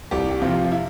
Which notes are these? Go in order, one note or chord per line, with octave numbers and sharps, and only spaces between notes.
C2 G4
G4
C3 F3 F4
F4
E4